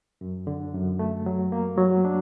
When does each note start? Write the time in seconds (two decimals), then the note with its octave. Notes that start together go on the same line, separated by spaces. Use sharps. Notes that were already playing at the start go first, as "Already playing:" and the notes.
0.21 F#2
0.47 D3
0.74 F#2
0.99 A3
1.26 F#3
1.52 A#3
1.78 F#3
2.05 D4